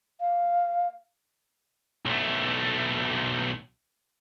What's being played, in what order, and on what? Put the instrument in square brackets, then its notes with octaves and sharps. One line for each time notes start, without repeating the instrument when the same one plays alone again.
[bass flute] F5
[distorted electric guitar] B1 A3